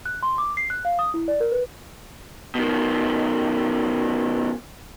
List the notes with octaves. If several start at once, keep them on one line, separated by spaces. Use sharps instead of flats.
F#6
C6
D6
C7
F#6
F5
D#6
E4
D5
A#4
B4
B2 D#3